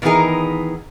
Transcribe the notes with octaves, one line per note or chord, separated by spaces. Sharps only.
D#3 E3 B3 D#4 G#4 A#4